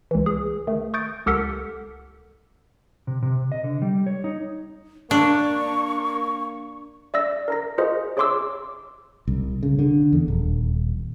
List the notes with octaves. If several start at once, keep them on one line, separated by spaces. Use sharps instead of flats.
C#2 E3
G#4
D#3 A3
C#6 D#6 G6 A6 D7
C#2 G4 A4 A#4 F#5 B6
C3
C3
D#5
D3
G3
C#5
D#4
A#3 D4 C#6
D5 E5 E6 A#6
A#4 A#5 A#6
F4 F#4 G#4 A#4 C5 D#5
G#4 C#5 E5 C6 D6 E6
C2
C#3
D3
E2
D#1